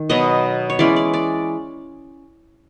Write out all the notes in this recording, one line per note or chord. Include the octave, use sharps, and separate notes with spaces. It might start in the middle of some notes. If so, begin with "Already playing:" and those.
Already playing: D#3
B2 F#3 B3 D#5
C#5
E3 G#3 C#4 D5
D5
D5